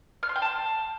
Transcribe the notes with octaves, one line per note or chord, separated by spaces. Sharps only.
F6
C6
G5
A5